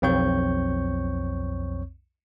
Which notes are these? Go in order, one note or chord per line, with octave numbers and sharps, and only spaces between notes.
B1 F2 C4 C#5 C#6 G6